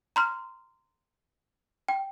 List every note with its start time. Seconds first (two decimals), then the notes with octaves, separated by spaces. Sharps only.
0.16 A#5 C6 F6
1.89 G5